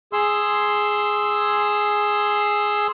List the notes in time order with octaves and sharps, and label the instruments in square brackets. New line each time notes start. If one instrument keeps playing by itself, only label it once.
[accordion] G#4 C6 E6